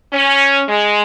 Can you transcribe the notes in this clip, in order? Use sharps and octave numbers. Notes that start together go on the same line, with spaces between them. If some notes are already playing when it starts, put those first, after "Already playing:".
C#4
G#3